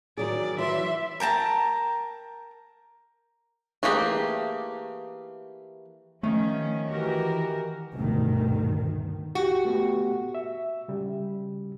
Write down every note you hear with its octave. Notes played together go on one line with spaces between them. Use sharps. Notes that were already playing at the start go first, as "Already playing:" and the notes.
D#3 F#3 G#4 D5
E3 F#3 E5 C6
A#4 G5 A5 A#5
E3 A3 A#3 G4 G#4
D#3 F3 A3 C#4
E3 F#4 G4 A#4
D2 G2 B2 D#3
F#4 G4
A3 B3 G4
E5
C#3 G3